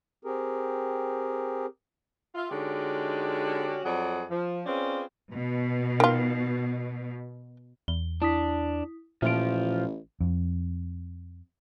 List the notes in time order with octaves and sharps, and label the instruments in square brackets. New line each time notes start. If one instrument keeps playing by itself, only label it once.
[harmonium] C4 G4 G#4 A#4
[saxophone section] F4 E5
D3 G#3 C#4 D#4 F#4 G4
F2 F#3 G#4 D5 F#5
F3
C4 C#4 F4 G#4 B4 D5
[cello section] B2
[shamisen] D#3 F4
[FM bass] E2 [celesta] G7
[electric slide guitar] D4 [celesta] E4 D#6 B6
[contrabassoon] A1 [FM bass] A#2 [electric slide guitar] F3 F4 [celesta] E5 D7
[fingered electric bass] F2